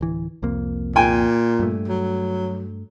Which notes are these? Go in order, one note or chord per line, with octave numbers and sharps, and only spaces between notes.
D1 E3
C2 F2 A#3
A#2 G5 G#5
G2 A3
F#3